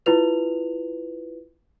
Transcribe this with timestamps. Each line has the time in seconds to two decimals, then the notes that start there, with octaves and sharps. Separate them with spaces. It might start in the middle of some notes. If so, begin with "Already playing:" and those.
0.06 E4 F4 B4 F7